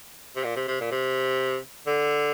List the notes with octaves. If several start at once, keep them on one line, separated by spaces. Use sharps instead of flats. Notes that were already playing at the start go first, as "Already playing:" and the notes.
C3
A#2
C3
C3
A#2
C3
D3